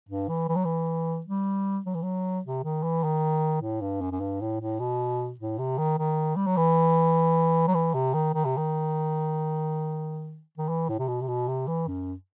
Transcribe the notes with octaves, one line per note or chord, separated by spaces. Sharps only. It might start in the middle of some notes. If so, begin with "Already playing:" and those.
G2
E3
E3
F#3
E3
G3
F#3
E3
F#3
C3
D#3
E3
D#3
A2
G2
F#2
F#2
G2
A2
A2
B2
A2
C3
D#3
D#3
G3
F#3
E3
F#3
E3
C3
D#3
D#3
C3
D#3
D#3
E3
A2
C3
B2
C3
B2
C3
E3
F#2